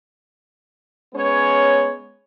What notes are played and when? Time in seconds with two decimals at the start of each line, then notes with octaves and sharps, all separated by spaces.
1.14 G#3 B3 C#4 C#5